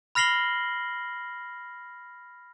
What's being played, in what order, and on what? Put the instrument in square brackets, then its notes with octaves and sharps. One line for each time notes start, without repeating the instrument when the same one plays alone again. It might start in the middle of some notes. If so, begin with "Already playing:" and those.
[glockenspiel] B5 F6 A#6 C7 F#7 G7